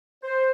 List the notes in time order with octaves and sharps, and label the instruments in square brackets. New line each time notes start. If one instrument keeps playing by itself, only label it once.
[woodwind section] C5